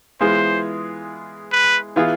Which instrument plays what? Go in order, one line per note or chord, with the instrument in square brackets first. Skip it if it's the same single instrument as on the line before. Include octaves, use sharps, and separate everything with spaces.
[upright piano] E3 G#3 B3 F4 G#4 [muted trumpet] C5
[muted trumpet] B4
[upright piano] E3 B3 F4 G#4